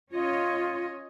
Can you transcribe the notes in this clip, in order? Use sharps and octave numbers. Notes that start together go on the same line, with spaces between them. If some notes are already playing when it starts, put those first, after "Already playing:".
C#4 F4 C#5 D#5